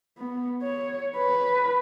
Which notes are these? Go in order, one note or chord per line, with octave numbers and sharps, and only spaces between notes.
B3
C#5
B4